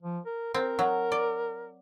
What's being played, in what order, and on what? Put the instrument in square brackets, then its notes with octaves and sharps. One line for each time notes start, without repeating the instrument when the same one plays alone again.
[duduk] F3
A#4
[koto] C4 [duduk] A#4
[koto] F#3
D5